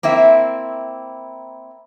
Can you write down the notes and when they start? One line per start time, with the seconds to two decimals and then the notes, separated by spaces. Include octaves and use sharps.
0.03 A#3 C4 E4 E5